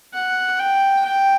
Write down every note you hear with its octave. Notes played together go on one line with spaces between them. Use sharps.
F#5
G5
G5